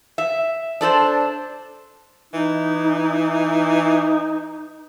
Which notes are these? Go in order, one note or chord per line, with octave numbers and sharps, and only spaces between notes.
E5
D4 A4 B4 C5
E3 D#4